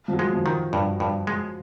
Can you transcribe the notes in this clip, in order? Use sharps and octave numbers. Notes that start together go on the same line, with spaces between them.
F3
F#3
G#3
F3
D#3
G2
G2
G#3